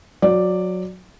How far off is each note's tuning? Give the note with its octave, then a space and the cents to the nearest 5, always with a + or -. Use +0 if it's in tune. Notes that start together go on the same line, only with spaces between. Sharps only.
F#3 -15 D5 +0